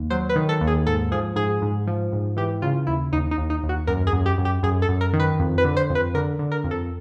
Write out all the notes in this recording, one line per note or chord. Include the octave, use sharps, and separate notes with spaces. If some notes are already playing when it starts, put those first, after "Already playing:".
Already playing: D#2
F#3 C5
B4
D#3
A4
D#2
G#4
G#2 A4
F3 G#4
G#2 G#4
G#2
F3
G#2
E3 G4
C#3 F4
D#2 E4
D#2 D#4
D#4
D#2
D#4
D#2
F#4
F#2 A#4
G#4
F#2
G4
F#2
G4
F#2 G#4
A4
F#2
A#4
D#3
B4
F2
B4
D3
C5
F2
B4
D3 A#4
D3
A#4
F2
A4